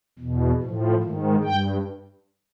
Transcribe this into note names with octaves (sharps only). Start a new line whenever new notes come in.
E2 B2
A2 F3
G#2 D#3
G2 G5